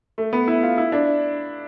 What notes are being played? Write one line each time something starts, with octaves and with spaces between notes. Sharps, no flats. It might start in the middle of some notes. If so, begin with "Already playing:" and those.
A3
B3
E4
F4
E4
D4